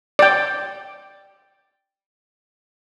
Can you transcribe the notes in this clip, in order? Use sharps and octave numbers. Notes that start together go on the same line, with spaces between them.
D5 G5